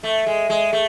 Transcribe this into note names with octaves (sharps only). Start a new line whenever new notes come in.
A3 E5
G#3
G#3
A3